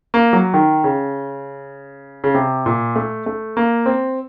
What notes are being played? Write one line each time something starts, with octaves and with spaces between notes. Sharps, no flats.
A#3
F#3
D#3
C#3
C#3
C3
A#2
A3
A3
A#3
C4